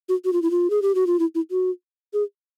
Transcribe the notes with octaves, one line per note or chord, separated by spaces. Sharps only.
F#4
F#4
F4
E4
F4
G#4
G4
F#4
F4
E4
E4
F#4
G#4